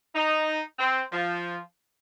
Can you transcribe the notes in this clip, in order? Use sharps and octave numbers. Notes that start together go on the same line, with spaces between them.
D#4
C4
F3